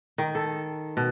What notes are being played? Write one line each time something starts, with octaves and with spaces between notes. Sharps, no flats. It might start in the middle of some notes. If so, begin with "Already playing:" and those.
D#3
A4
B2